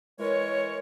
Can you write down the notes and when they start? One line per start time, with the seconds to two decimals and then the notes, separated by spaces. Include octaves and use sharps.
0.19 E3 G#3 A#4 C#5